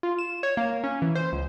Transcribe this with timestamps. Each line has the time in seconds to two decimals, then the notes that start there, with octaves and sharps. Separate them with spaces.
0.03 F4
0.19 E7
0.43 C#5
0.57 A#3
0.84 C#4
1.02 E3
1.15 C5
1.32 C#2